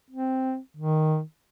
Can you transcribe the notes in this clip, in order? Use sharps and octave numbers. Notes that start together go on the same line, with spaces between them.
C4
D#3